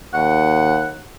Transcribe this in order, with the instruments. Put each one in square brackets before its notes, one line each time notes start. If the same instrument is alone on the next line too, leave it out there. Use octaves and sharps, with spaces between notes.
[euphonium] D#2 [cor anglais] F#5